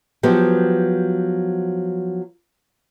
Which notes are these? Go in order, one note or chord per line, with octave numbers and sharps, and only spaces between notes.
F3 F#3 B3 G4